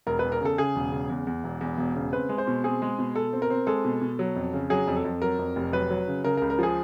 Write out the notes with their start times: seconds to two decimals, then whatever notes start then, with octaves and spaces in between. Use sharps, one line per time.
0.07 E1 A#4
0.19 E2 B4
0.32 A#4
0.41 C#3 A4
0.58 C#3 G#4
0.76 E1
0.92 C#3
1.10 E2
1.27 E2
1.44 E1
1.61 E2
1.78 E1
1.96 C#3
2.13 C4 B4
2.29 G#3
2.38 C5
2.47 B2
2.64 C4 G#4
2.82 G#3
2.99 B2
3.15 B2 A4
3.33 C4
3.42 A#4
3.50 C4
3.67 G#3 A4
3.85 B2
4.01 B2
4.19 F#3
4.36 F2
4.53 C#3
4.70 F#3 G#4
4.87 F2
4.96 A4
5.04 F2
5.22 F#3 A#4
5.39 F2
5.56 F1
5.73 F#3 B4
5.90 F#3
6.08 C#3
6.24 C#3 A#4
6.37 A#4
6.42 C#2
6.50 A#4
6.59 F3 G#4